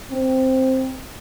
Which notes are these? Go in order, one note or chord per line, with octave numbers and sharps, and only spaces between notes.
C4